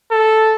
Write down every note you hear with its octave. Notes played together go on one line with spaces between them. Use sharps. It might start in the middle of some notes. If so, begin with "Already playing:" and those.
A4